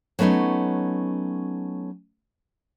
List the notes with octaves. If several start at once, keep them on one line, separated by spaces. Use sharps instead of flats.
F#3 A3 B3 C#4 D#4